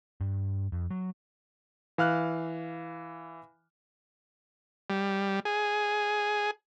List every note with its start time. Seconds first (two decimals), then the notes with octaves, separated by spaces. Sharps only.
0.21 G2
0.72 F2
0.91 F#3
1.98 E3 F5 F6 F#6
4.90 G3
5.45 G#4